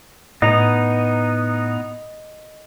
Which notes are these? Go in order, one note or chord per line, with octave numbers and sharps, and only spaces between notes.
A2 B3 D#4 D#5 A#5 A#6